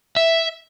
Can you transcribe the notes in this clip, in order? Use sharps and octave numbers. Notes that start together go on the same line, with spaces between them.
E5